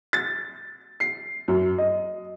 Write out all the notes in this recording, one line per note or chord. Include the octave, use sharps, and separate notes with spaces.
A6
C7
F#2
D#5